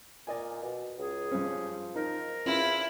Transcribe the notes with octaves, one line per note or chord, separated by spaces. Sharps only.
A#2 D5 D#5 G#5
B2
C#2 G#4
G2 F3 C#4
D#4 A#4
E2 C#4 E4 F4